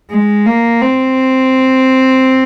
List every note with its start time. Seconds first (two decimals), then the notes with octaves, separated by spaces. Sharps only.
0.11 G#3
0.46 A#3
0.82 C4